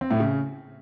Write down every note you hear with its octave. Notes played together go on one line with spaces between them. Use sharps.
C4
A2
C#3